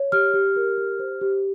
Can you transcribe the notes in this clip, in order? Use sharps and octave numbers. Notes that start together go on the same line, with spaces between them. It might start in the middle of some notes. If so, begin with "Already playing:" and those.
Already playing: C#5
G4 F6
G4
A#4
G4
C5
G4